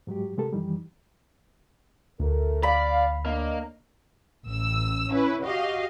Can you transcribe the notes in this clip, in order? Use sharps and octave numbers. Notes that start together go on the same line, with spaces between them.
G#2 F#3 G#3 G4
C3 G#3 A3 G4 A4 A#4
F#2 D#3 E3 G3
D2 A3 A#4
D5 F5 B5
A#3 D4 C#5 D#5
A1 E6
C#4 E4 B4
F#4 G4 D#5 F5